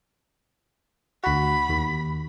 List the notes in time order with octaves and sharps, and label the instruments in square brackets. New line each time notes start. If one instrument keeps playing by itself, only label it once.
[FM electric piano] D2 F#4 [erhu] B5
[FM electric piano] D#2